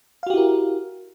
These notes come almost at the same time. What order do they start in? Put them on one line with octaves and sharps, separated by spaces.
F5 F#4 G4 E4 A#4